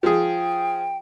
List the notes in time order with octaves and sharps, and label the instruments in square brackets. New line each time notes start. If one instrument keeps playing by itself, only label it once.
[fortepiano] F3 G#4 [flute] G5